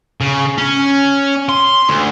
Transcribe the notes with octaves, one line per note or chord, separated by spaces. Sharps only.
C#3
C#4
C6
D2